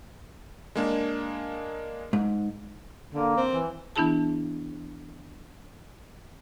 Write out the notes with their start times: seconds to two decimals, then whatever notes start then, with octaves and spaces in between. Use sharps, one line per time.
0.76 G#3 A#3 D4
2.13 G#2
3.14 D3 A#3
3.37 C4
3.53 E3
3.96 E3 B3 D4 E4 G#4 A5